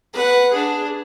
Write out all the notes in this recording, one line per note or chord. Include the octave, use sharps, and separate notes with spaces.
B4 F#5
D4 G#4